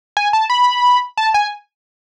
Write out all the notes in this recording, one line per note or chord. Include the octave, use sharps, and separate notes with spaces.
G#5
A5
B5
A5
G#5